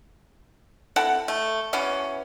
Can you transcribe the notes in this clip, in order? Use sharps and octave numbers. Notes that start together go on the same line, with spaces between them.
C4 E4 A4 F#5
A3
E3 F#3 B3 C#4